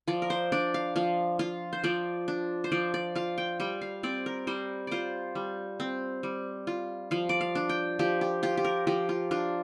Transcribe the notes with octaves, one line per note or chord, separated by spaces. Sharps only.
F3 D5
A#4
C5
D4 D5
F5
F3 F5
F4 F5
C5
F3 D5
D4
C5
F3 D5
D5
F4 F5
G5
G3 G5
F5
C4 D5
A#4
G3 C5
F4 C5 D5
G3
C4
G3
F4
F3 F5
D5
F5
D4
G5
F3 G4
G4
F4 G4
G4
A#4
F3 G4
F4
D4 F4